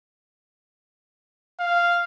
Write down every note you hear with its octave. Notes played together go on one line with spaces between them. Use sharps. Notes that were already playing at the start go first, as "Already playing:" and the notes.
F5